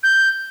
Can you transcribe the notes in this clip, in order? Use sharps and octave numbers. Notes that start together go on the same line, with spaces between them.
G6